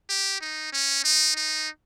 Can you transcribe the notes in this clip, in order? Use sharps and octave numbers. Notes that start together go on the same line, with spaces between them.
G4
D#4
C#4
D#4
D#4